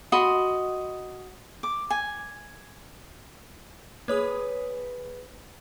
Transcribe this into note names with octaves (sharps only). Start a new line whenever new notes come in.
F#4 D#5 B5 C6
D6
G#5
A#3 G#4 B4 C#5 D#6